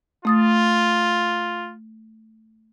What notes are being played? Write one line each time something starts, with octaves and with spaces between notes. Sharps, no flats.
A3 F4 D#6 A6